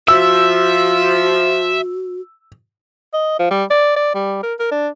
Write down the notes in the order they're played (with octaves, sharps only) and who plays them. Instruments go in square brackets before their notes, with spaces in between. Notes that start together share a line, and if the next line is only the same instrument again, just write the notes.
[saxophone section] F3 [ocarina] F#4 [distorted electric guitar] E5 [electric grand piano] E6
[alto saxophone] D#5
F3
G3
D5
D5
G3
A#4
A#4
D4